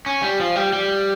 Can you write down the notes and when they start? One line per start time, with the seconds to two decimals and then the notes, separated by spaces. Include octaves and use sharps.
0.06 C#4
0.22 G3
0.40 F3
0.56 G3
0.73 G3